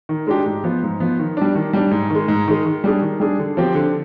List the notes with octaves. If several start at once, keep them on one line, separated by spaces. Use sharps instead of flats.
D#3
G#3 D4 G4
G#2
F3 B3
G#2
F3 B3
D#3
G3 D4
D#3
G3 D4
G#2
D#3 G#3
G#2
D#3 G#3
D#3
G3 D4 G#4
D#3
G3 D4 G#4
D3
F3 C4 G4
D3